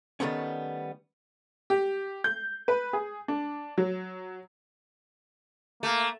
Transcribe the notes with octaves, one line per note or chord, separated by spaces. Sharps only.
D#3 E3 G3 A3 B3 C#4
G4
G6
B4
G#4
D4
F#3
A3 A#3